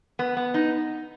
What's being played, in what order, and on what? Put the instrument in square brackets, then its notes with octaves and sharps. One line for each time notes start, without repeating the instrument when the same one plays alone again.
[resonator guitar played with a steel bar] B3
B3
D#4